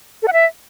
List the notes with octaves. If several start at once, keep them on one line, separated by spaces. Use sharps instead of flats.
A4
F#5
E5